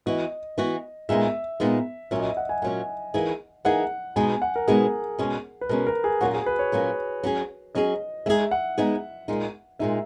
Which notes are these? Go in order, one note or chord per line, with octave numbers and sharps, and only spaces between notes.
E3 B3 F#4 D#5
E3 B3 F#4
A#2 G#3 B3 D#4 E5
A#2 G#3 B3 D#4
A#2 F#3 C#4 E5
D#5
E5
F#5
G#5
A#2 F#3 C#4 G#5
E3 A#3 D#4 G#4
E3 A#3 D#4 G#4 F#5
B2 G#3 B3 D#4 G#5
F#5
A#4
B2 G#3 B3 D#4 G#4
B2 G#3 C#4
B4
B2 G#3 C#4 A#4
A#4
G#4
A#2 F#3 A#3 C#4 F#4
G#4
B4
C#5
A#2 F#3 A#3 C#4
F#3 C#4 G#4
F#3 C#4 G#4 D#5
G#3 B3 D#4 G#4 E5
F#5
G#3 B3 D#4 G#4
A#2 G#3 D#4
A#2 G#3 D#4 E5